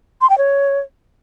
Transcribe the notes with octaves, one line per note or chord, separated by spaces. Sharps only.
C6
G5
C#5